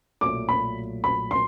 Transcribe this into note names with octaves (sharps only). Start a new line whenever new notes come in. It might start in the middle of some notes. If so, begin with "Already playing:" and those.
B1 A#2 F#3 A3 D6
B5
B5
C6